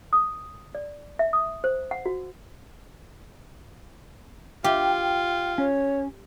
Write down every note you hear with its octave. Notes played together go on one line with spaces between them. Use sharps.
D#6
D5
E5
D#6
C5
F#5
F#4
F4 G4 G5
C#4 C#5